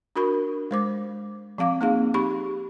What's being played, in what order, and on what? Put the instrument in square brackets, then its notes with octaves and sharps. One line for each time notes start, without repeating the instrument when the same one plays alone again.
[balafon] D4 F#4 A#4 B5 C#6
G#3 C5 D6
F3 C4 F5 D6
A#3 C4 D#4 G#4 F5
D#4 G4 B5 C#6